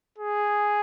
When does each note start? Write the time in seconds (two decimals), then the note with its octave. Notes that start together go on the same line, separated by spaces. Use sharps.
0.18 G#4